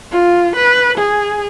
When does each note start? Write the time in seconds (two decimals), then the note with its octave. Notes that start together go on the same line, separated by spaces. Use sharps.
0.11 F4
0.56 B4
0.98 G#4